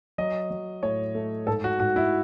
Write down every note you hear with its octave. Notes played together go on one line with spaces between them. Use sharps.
F#3 D#5
F#3
A2 C#5
A3
G#2 A4
F#4
G#2 F#4
E4